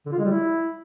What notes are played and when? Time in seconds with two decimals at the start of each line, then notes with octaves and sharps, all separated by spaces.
0.06 D3
0.12 F4
0.18 G#3
0.25 G3
0.31 E4